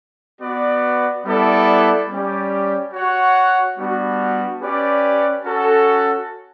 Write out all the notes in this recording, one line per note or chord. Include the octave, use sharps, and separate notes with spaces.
B3 F#4 B4 D5
G3 B3 E4 A4 D5
G3 C#4 G4 D5
F#4 C#5 F#5
G3 B3 D4 F#4
C#4 G4 B4 D5
C#4 F#4 A4